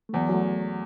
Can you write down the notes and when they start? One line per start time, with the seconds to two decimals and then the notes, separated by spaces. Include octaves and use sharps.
0.09 A3
0.13 E2 F#3
0.29 F#3
0.34 A3